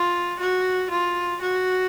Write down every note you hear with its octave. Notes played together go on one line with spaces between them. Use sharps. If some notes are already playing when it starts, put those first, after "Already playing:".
Already playing: F4
F#4
F4
F#4